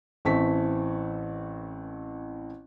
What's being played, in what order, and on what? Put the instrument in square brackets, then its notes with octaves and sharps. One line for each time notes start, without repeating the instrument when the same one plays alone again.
[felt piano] A1 E3 C4 A5 C#6 B6